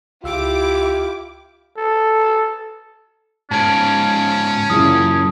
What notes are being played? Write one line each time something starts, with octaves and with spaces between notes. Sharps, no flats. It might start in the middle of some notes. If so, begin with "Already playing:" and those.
C#2 E4 F4 G4 D6 E6
A4
G#2 C#4 F4 A5 G#6 D7
F#2 A#2 C#3 E3 D#6